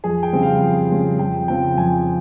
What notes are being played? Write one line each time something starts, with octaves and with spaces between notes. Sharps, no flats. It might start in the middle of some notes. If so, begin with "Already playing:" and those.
F2 G#4
G5
C#3 G3 C4
F5
F2
C#3 G3 C4
F2 G5
C#3 F3 C4 G5
F2 G#5